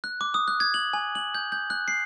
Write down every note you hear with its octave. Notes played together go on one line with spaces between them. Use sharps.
F#6
D6
D#6
F#6
G#6
F#7
G#5
F#7
G6
G6
F#6
C7